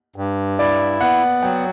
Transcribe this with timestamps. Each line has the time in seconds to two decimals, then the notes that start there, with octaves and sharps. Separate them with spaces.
0.16 G2
0.59 E4 D5
1.01 B3 F#5
1.43 F#3 G5